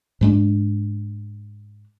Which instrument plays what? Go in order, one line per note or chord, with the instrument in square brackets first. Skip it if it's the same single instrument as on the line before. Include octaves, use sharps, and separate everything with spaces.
[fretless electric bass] G#2 G#3 A3 D4